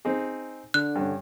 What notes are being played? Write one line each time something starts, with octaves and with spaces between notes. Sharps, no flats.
C4 D#4 G#4
D3 F#6
G2 C#4